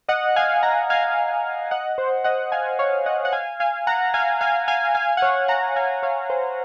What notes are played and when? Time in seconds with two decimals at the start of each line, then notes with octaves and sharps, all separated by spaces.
0.09 D#5 F#5
0.36 F5 G#5
0.63 F#5 A#5
0.90 F5 G#5
1.71 D#5 F#5
1.98 C5
2.24 D#5 F#5
2.52 F5 G#5
2.79 C#5 F5
3.06 D#5 F#5
3.25 F#5
3.33 F5 G#5
3.60 F5 G#5
3.87 F#5 A#5
4.14 F5 G#5
4.41 F5 G#5
4.68 F5 G#5
4.95 F5 G#5
5.17 F#5
5.22 C#5 F5
5.48 F#5 A#5
5.76 F5 G#5
6.03 C#5 F5
6.30 C5